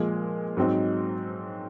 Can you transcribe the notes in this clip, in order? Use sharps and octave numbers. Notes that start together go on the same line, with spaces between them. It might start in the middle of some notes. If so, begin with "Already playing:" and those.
Already playing: A#2 F3 G#3
G#2 F#3 C4 D#4